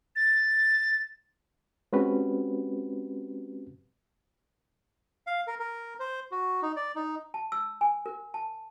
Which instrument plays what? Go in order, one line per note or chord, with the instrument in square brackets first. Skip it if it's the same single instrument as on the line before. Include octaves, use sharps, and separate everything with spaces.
[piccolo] A6
[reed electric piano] G#3 C4 C#4 F#4 G4 B4
[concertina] F5
A#4
A#4
C5
F#4
D#4
D5
D#4
[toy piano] A5
E6
G#5
A#4
A5